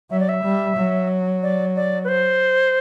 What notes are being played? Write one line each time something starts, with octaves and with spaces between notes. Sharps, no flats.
F#3 E5
D5
E5
G3
F#3
D5
D5
B4
C5